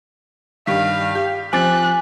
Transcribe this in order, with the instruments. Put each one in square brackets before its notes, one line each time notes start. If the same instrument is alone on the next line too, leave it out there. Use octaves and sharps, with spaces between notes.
[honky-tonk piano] G2 D#3 [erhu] F5 [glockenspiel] B6
[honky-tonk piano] G4
[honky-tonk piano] F3 C4 [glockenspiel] G#5 D6 A6 [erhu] F#6